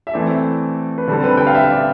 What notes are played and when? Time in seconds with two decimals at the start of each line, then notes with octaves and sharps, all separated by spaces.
0.07 E5
0.14 E3 A3 C4 D5
0.98 B4
1.08 D3 G3 C4 A4
1.24 B4
1.37 G5
1.47 F5
1.55 E5
1.71 D5